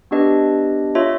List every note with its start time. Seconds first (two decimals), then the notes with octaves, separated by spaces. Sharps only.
0.11 B3 D4 G4 B4 D#5
0.95 F4 A4 C#5 E5